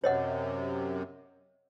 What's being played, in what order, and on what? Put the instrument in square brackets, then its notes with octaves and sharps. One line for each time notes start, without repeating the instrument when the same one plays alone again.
[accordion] F#2 C3 [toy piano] C#5 D#5 F#5